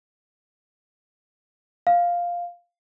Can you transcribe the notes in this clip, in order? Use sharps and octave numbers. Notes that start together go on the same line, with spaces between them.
F5